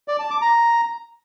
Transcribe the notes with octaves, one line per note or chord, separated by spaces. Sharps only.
D5
A5
D6
A#5